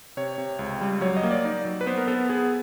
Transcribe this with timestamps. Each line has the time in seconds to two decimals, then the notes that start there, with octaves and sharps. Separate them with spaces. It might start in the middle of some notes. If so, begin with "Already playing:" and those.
0.17 C3 C#5
0.38 C3
0.59 C#2
0.81 G3
1.01 F#3 C#5
1.17 D#5
1.23 A#3
1.31 D5
1.45 D#4
1.65 F#3
1.81 B4
1.87 B3 C5
1.97 A#4
2.08 B3 A4
2.29 B3 G#4